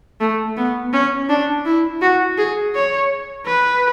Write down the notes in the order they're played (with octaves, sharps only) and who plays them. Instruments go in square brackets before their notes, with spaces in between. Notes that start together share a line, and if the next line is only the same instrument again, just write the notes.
[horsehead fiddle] A3
B3
C#4
D4
E4
F#4
G#4
C#5
B4